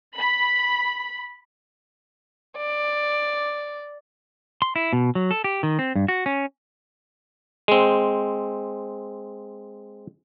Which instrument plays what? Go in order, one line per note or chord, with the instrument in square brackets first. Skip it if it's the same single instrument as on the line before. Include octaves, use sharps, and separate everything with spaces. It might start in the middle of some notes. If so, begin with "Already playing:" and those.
[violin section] B5
[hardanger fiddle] D5
[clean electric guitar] C6
E4
B2
F#3
A4
G4
D#3
C4
G2
F#4
C#4
[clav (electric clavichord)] G#3 C4